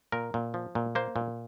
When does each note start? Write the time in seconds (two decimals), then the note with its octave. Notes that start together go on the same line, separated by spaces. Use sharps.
0.12 A#2 A#4
0.34 A#2
0.54 F3
0.75 A#2
0.95 A#3 C5
1.16 A#2